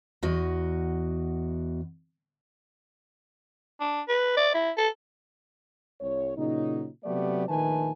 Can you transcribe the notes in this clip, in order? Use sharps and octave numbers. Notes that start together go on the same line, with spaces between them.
E2 F#4 D#5
D4
B4
D5
E4
A4
C2 C#5
A#2 C#3 F#3 D#4
C3 F#3 A3 B3 G4 D5
A#1 D#3 A3 B4 G#5 A5